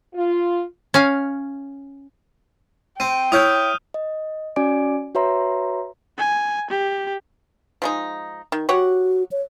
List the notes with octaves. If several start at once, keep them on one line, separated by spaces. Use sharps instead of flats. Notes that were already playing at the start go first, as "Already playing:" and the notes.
F4
C#4 F5
C4 G5 D#7
E4 C#5 D#6 F6 G6
D#5
C#4 F#4 D5 G#5 D6 D7
F#4 B4 C#5 E5 A#5 C6
G#5
G4
F3 G#3 D#4
D#3
F#4 G4 C#5 F#5
C#5